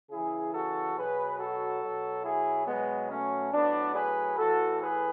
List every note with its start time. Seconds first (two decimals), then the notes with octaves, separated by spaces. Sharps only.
0.10 C#3 E3 E4 G#4
0.53 F#4 A4
0.96 B2 F#3 G#4 B4
1.39 F#4 A4
1.82 B2 F#3
2.24 E4 G#4
2.67 B2 F#3 G#3 B3
3.10 A3 C#4
3.52 A2 F#3 B3 D4
3.95 G#4 B4
4.38 A2 E3 F#4 A4
4.80 G#4 B4